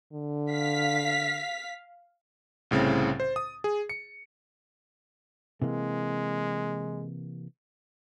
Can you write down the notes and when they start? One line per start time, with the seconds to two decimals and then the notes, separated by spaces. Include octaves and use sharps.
0.13 D3
0.50 F5 B6
2.71 C2 A2 C#3 C4 A6
3.20 C5
3.36 D#6
3.64 G#4
3.89 C#7
5.62 C3 E3 G#3 A#3